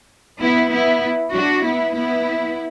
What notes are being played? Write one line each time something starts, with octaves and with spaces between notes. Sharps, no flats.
B3 E4
B3 E4
D4 F#4
B3 E4
B3 E4